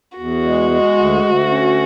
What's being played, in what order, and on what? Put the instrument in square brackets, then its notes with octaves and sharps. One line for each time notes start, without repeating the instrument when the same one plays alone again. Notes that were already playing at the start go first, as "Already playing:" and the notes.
[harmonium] E2 [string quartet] F#4
[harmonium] G#3
G#3
D2
D2
C#4